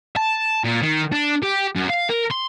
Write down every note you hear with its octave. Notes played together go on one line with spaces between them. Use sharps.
A5
A#2
D#3
D4
G4
F#2
F5
A#4
C6